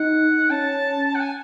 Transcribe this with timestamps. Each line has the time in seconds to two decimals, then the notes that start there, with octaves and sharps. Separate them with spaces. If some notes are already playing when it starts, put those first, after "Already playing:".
Already playing: D#4 F#5
0.51 C#4 A5
1.15 F#5
1.20 G#5